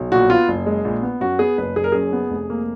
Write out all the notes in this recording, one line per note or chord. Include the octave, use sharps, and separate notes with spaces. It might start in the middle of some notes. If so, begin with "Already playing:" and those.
Already playing: B1
A#1 F#4
B3 F4
F#1
G#3
A#1
B3
F#2 F#4
B3 G#4
F#1 B4
F#1 G#4
A#4
F#2 G#4
B3
F1
A#3